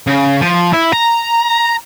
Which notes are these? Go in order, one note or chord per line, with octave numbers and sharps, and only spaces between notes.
C#3
F3
E4
A#5